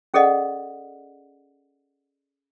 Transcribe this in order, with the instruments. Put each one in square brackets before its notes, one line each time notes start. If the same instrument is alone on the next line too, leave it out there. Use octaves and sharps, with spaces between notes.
[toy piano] C#4 G#4 A4 D5 D#5 F#5